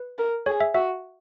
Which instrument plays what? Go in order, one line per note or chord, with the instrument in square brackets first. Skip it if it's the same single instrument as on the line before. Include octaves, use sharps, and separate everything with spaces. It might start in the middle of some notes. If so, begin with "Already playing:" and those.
Already playing: [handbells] B4
[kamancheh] A#4
[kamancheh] G#4 [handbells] C#5
[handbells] E5
[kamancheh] F#4 [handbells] E5